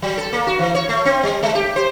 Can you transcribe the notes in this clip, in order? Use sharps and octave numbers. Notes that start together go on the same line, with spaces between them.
F#3
A4
A#3
F#4
E3
C#5
A3
C4
G3
G#3
G4
C5